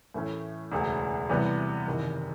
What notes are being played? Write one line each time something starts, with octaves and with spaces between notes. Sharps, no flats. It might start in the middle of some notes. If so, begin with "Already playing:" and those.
A2 E3 A3 C#4
E1 D2 C#3
C3 E3 G3 B3
F#1 E2 C3 D#3